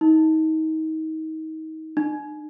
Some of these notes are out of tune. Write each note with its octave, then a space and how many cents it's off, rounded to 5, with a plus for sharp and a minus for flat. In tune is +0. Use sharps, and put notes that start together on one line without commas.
D#4 +30
D#4 -40